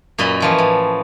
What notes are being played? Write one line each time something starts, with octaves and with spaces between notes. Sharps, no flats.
F#2 A#2 D#5 B5
E3 F3 C#4
A2